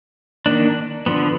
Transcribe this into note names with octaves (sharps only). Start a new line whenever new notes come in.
D#3 A#3 D4
D3 F3 B3